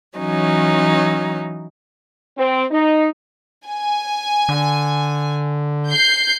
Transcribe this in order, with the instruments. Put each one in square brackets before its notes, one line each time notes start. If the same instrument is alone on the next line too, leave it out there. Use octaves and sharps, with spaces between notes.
[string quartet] E3 F#3 C#4 D#4
[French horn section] C4
D#4
[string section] G#5
[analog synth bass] D3
[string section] G6 C7